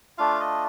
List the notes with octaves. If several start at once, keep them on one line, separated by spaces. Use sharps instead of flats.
A3 D4 F4 F5
D#5